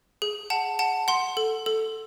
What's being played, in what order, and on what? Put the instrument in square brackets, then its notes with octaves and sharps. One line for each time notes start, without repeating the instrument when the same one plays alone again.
[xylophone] G#4
F#5 A5
F#5 A5
F#5 C6
A4
A4